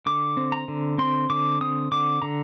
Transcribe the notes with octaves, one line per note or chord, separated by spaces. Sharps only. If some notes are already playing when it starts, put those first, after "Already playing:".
D3 D6
C4
A#5
D3
C4 C6
D3 D6
C4 D#6
D3 D6
D3 A#5